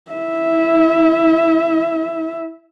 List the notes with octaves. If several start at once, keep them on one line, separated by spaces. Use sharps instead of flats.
E4 E5